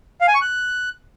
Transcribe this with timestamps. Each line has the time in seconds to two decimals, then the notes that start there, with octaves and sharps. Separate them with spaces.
0.21 F5
0.28 G#5
0.35 C#6
0.42 F#6